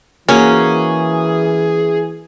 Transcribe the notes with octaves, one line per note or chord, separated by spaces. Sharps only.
E3 A#3 C#4 F#4 G#4